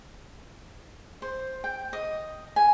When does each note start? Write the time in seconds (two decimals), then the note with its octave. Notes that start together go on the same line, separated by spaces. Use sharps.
1.22 C5
1.64 G5
1.93 D#5
2.56 G#5